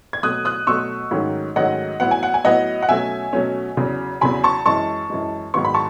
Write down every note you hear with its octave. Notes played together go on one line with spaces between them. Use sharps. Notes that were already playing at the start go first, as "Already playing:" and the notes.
G#6
B2 F#3 A3 D#6 F#6
D#6 F#6
B2 F#3 A3 C#6 E6
G#2 D#3 F#3 A3 C#4
G#2 D#3 F#3 A3 C#4 D#5 F#5
A2 F#3 B3 F#5
G#5
F#5
G#5
A2 F#3 B3 D#5 F#5
F#5
B2 F#3 A3 C#4 E5 G#5
B2 F#3 A3 C#4
E2 C#3 F#3
E2 C#3 F#3 G#5 B5
A5 C#6
F#2 E3 G#3 A5 C#6
F#2 E3 G#3
G#2 D#3 F#3 B3 C#6
B5
A5 C#6